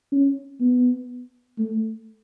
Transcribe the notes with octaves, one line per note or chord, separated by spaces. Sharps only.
C#4
B3
A3